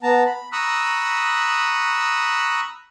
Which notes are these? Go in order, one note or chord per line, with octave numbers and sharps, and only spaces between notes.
B3 A5 A#5
B5
A#5 B5 C#6 D#6 E6 F#6